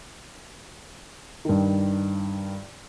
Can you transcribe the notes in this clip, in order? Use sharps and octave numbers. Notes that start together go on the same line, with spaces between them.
G2 D#3